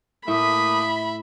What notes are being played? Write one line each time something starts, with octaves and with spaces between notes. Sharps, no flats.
A2 A3 A#3 E5 B5 D#6